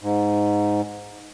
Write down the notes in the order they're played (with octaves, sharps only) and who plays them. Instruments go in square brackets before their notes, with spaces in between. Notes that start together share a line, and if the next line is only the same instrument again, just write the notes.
[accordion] G#2